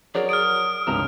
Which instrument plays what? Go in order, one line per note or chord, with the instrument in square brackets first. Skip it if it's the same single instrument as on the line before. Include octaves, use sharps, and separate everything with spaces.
[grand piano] F#3 [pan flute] G#4 [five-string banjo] A#4 C#5 D5
[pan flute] D#6 [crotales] F6 D7
[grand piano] C#2 G2 C3 [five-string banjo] D#3 F3 A#5